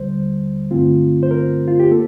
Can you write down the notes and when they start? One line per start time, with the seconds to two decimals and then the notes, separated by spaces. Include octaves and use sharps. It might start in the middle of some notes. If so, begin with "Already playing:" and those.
Already playing: D#2 D3 G3 C5
0.71 G2 D3 A3 C4 F4
1.23 C5
1.31 A#4
1.68 F4
1.80 G4
1.91 A#3 A4